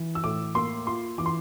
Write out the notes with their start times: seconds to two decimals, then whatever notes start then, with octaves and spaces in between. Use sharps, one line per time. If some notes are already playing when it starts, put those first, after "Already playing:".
Already playing: E3
0.15 E6
0.24 A2 D6
0.55 A#3 C6
0.87 F4 C6
1.18 E3 D6
1.26 C6